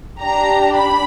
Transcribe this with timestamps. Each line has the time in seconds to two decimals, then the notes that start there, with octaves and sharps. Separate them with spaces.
0.20 D4 G4 A#5
0.75 B5